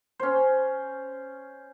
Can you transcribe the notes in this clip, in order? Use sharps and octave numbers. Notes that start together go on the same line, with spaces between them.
C#4 C5